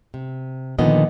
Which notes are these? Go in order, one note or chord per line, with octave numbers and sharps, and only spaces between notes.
C3
A#2 D3 D#3 F3 B3 D#5